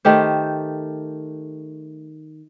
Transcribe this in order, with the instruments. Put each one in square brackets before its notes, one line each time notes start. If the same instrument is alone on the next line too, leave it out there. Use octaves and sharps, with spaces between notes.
[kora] D#3 A3 G4 C5